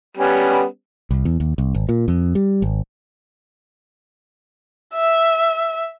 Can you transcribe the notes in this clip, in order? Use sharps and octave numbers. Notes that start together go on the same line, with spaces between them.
G3 B3 C#4
C2
E2
D#2
C2
G#1
A#2
F2
G3
G#1
E5